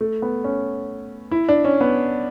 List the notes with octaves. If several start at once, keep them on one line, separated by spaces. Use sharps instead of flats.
A3
B3
C#4
E4
D4
C#4
B3